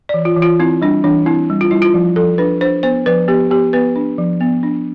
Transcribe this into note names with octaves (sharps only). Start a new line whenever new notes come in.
E3 D5
F4
E3
F4
C4 E4
G3 D4
E3 D4
C4 E4
G3
F4
G3 E4
F4
F3
F3 A4
D4 B4
D4 C5
B3 C5
F3 B4
B3 G4
B3 G4
B3 B4
D4
F3
B3
D4